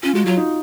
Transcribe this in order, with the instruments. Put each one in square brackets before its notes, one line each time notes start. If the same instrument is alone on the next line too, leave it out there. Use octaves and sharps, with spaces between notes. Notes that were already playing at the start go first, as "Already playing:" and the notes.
[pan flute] C#4 [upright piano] F4
[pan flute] G#3 [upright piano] F#4
[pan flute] F#3 [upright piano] F4
[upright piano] D#4